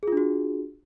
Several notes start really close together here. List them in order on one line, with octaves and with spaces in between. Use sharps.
G#4 F4 D4 F#4